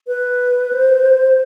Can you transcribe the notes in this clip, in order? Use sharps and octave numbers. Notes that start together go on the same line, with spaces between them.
B4
C5